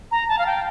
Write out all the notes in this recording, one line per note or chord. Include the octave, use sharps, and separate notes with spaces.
A#5
A5
F5
G5